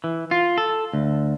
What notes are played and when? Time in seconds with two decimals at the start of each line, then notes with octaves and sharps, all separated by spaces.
0.04 E3
0.31 F4
0.58 A4
0.93 D2